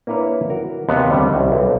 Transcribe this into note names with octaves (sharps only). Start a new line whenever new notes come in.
A#3 D4 E4 B4 C#5
F#4 A#4
D#2 C3 B3 F#5
D3 F3 G3 C4 C#4
C2
B1